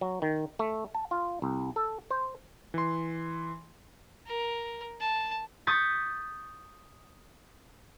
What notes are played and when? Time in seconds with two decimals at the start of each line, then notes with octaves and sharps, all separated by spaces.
0.01 F#3
0.22 D#3
0.59 A3
0.95 A5
1.11 F4
1.42 C2
1.76 A4
2.11 C5
2.74 E3 C6
4.27 A#4
5.00 A5
5.67 C#6 D#6 G6 A6 B6